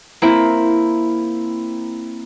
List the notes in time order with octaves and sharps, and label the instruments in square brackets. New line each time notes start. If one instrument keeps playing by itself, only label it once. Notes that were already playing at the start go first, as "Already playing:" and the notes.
[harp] A#3 C4 E4